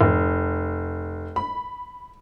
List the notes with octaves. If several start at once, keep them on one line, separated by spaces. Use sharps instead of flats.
F1
B5